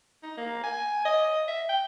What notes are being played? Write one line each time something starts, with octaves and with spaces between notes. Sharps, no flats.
D#4
A#3
G#5
D#5
E5
G5